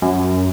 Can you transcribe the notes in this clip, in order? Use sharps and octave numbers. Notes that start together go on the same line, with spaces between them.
F#2